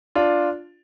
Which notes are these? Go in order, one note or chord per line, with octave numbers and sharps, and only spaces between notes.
D4 F4